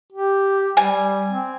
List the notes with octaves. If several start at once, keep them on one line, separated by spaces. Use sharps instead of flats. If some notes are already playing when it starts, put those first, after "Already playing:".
G4
G3 G#5
C4